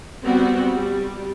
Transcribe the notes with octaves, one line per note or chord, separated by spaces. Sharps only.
G3 B3 C4 F#4
G3